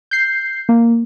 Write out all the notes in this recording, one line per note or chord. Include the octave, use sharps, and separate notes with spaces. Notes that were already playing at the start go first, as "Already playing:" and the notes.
G6 C7
A#3